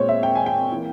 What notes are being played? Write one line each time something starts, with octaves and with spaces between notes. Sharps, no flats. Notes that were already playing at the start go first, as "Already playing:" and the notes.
Already playing: A#2 G#3 C4 C5 C#5
E5
G5
G#5
G5
E3 A#3